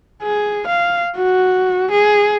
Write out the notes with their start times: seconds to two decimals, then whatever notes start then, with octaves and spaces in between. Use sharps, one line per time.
0.23 G#4
0.67 F5
1.17 F#4
1.91 G#4